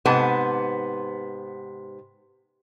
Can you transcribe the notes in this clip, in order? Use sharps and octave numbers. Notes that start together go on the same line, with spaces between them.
G#2 C3 B3 A5